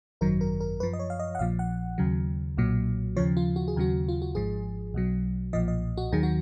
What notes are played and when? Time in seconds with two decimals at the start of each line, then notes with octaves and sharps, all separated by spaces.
0.21 G#1 F#2 D#3 F#3 A#4
0.41 A#4
0.60 A#4
0.80 F#2 F3 B4
0.93 D#5
0.99 C#5
1.10 F5
1.19 D#5
1.35 F#5
1.39 A#1 A#2 F3 F5
1.59 F#5
1.98 D#2 C#3 F#3
2.57 B1 A#2 F#3
3.16 D#2 C#3 F3 C#5
3.37 F4
3.56 F#4
3.68 G#4
3.76 D#2 C#3 F#3 F#4
4.09 F4
4.22 F#4
4.35 G#1 G#2 F3 G#4
4.94 B1 B2 F#3
5.53 B1 A#2 F3 D#5
5.68 D#5
5.97 F#4
6.12 D#2 D#3 F#3 G#4
6.23 F#4